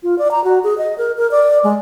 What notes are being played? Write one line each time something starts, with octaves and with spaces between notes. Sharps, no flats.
F4
D5
A#5
F#4
G#4
D#5
A#4
A#4
D5
G#3